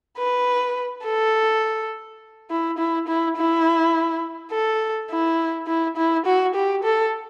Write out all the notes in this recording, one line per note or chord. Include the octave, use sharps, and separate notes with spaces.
B4
A4
E4
E4
E4
E4
A4
E4
E4
E4
F#4
G4
A4